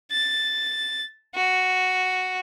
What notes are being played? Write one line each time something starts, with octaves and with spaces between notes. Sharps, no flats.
A6
F#4